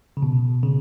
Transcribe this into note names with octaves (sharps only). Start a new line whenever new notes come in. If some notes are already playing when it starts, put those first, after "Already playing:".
C#3
B2
C#3